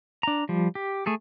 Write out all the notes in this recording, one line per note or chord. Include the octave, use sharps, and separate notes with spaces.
D4 A#5
F3 G3
G4
A3 G#4 A4